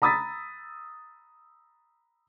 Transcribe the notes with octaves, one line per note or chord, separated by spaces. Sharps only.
A#5 B5 D#6 E6 A6 B6